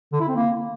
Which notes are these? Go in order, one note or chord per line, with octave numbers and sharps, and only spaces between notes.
D3
E4
C4
A#3